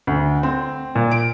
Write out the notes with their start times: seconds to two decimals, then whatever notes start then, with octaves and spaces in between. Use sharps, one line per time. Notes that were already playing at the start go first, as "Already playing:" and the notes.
0.07 D2
0.43 C4
0.95 A#2
1.11 D7